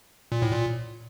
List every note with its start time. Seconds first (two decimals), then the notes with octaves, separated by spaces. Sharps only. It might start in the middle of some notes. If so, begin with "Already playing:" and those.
0.32 A#2
0.42 A2
0.52 A#2